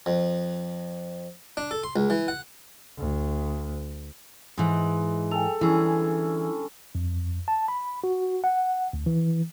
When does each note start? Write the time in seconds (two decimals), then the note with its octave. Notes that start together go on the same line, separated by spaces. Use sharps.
0.06 F2
1.57 D4
1.71 A4
1.84 C6
1.96 C#2
2.10 E3
2.28 F#5
2.98 D2
4.58 G#2 E3 G#3
5.31 A4 G5 G#5 F7
5.61 D3 E3 G3 C#4 E4 G#4 E6
6.95 F2
7.48 A5
7.68 B5
8.04 F#4
8.44 F#5
8.93 D2
9.06 E3